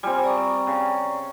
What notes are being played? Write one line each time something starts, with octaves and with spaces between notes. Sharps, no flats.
G3 C4 F4 G#4 G#5
D5 A#5 C#6
C#3